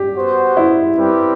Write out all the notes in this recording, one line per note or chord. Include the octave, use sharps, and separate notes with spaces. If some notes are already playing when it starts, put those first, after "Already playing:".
Already playing: G4
B3 F#4 C5
E4
G3 C4 G4 B4